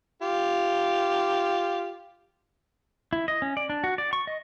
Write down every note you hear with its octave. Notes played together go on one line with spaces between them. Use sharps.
F4 G4
E4
D#5
C#4
D5
D4
F#4
D5
C#6
D#5